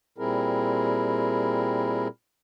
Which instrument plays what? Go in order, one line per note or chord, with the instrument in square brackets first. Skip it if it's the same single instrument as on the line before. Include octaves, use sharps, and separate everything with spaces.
[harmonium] A#2 G3 C4 E4 G#4 A#4